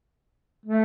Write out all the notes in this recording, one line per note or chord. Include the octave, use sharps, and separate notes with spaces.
A3